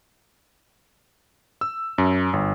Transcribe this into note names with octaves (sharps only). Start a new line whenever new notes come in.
E6
F#2
G1